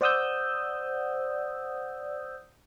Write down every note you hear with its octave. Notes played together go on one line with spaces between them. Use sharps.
C5 D5 F#5 D#6 E6 G6